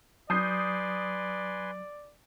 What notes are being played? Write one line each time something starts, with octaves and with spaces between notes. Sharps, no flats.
F#3 B4 D5 G#5 C6 D#6 G6 C7